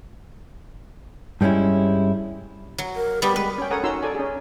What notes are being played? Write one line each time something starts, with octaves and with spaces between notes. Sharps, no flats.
G2 G3 G#3 C#4 E4
F#3
A#4
G3 B3 G4 B5
G#3 B4
C#4 G5
A4 A#4 C#5 F#5 G#5 D#6
C#4 D#4 F#4 A#5 C6 E6
A4 D5 G#5
C#4 G#4